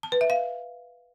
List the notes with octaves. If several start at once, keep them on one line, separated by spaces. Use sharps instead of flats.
A5
B4
E5
F5